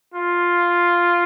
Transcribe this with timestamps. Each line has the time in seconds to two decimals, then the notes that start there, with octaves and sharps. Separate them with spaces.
0.14 F4